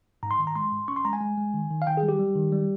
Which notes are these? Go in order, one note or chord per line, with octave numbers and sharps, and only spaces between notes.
G#2 A#5
C6
D#3
A#5
G#3 C6
G#2
C#4 C#6
C6
G#3 A#5
G#5
G#3
G#3
D#3
D#3
F5
D#3 G5
G#4
G3
G4
G3
D#3
G3